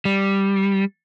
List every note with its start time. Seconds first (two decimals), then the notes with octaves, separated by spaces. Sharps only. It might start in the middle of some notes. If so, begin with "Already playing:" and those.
0.05 G3